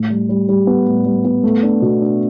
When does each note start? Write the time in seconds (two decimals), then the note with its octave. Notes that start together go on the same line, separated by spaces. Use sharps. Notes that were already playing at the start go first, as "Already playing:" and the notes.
Already playing: A2
0.10 G3
0.29 G3
0.49 G3
0.67 B3
0.86 A2
1.06 G3
1.25 B3
1.43 A3
1.63 D4
1.82 B2
2.01 D4